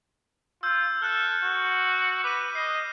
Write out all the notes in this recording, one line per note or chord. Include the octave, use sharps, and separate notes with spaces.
F4 E6 G6
A4 F6 F#6
F#4
B4 D6 D#7
D#5 C7